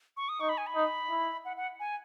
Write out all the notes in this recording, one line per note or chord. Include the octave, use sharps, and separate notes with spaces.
C#6
D#6
D#4 C#6
B5
G#5
B5
D#4
E4
F#5
F#5
G#5